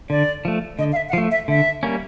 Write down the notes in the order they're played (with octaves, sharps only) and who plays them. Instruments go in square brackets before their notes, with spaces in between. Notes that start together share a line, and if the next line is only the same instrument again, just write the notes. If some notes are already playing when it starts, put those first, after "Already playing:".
[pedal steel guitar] D3 [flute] D5
[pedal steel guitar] F3 A3
[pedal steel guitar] D3 [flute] D#5
[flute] F5
E5
F#5
[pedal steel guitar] F3 A3 [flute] F5
[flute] E5
[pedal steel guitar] D3 [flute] E5
[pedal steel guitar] G3 A#3 C#4